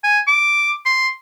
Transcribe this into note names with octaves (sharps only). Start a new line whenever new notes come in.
G#5
D6
C6